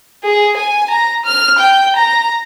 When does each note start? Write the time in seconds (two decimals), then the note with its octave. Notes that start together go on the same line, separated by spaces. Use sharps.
0.24 G#4
0.57 G#5
0.90 A#5
1.25 F6
1.58 G5
1.96 A#5